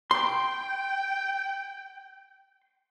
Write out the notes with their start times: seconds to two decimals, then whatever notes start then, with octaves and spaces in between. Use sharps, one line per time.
0.11 G5 C6